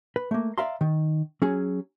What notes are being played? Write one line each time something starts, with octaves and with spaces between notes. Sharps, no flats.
B4
A3 A#3
D5 E5 F5 A#5 C6
D#3
F#3 C#4 G#4